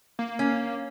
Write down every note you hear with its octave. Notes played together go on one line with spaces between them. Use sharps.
A#3
C#4